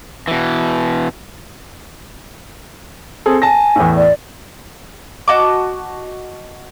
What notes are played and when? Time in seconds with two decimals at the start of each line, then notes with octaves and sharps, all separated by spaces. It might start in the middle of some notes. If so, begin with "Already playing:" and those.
0.28 B2 E3
3.26 C4 G#4 A4
3.42 G#5 A5 A#6
3.76 E2 A2
3.97 D5
5.28 F#4 D#5 A5 D6